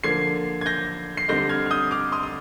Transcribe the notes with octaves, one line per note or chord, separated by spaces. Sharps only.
D3 F3 A#3 G#6 C7
G#6
G6 A#6
C7
D3 G3 C4 D#4 G6 A#6
F6 G#6
F6
D#6 G6
D6 F6
C6 D#6
D#6